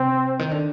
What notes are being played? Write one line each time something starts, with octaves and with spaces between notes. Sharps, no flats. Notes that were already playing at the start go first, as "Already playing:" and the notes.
Already playing: C3 C4
D#3
D3